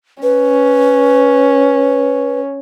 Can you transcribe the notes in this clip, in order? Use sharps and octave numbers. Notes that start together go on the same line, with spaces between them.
C#4 B4